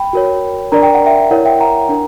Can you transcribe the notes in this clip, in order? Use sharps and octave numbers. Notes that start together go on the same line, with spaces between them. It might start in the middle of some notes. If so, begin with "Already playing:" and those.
Already playing: G5 B5
F#4 A#4 C#5
D4 A#4 D5 A#5
G5
F#5
E5 G5
E4 A#4 C#5 F#5
E5 G5
F#5 A#5
D4 A#4